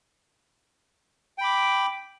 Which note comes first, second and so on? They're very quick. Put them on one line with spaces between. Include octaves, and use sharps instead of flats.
G5 B5 D6